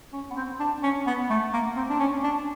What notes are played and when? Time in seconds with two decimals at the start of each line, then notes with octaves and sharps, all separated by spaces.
0.13 C#4
0.31 B3
0.37 C4
0.60 D4
0.83 C#4
1.07 B3
1.30 A3
1.53 A#3
1.76 C4
1.89 D4
1.99 C#4
2.24 D4